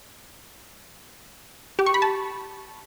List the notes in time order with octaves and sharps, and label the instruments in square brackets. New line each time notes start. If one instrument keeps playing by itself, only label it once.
[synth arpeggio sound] G4
C#6
B5
A5